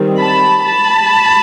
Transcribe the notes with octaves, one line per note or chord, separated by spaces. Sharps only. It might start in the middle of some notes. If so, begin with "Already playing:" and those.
Already playing: D#3 G3 C4
A5 B5
A5 B5